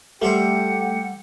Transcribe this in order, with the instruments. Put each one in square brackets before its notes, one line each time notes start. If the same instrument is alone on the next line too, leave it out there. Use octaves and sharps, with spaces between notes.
[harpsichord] G3 A4 C5 [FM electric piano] A3 [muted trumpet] G4 [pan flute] F#5